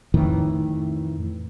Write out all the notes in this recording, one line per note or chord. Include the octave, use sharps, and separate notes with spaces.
F2 A2 D#3 E3